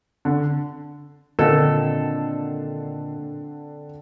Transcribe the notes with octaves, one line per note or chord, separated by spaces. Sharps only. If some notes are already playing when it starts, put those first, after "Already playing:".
D3
A#2 D3 D#3 C4 A4 F#5 E7